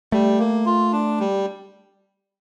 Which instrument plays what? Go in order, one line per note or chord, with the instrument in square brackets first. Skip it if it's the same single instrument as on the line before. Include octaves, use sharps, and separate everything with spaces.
[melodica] G3 [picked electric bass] A3
[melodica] A#3
F4
D4
G3